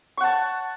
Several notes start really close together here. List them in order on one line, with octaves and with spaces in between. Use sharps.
C#6 F#5 A5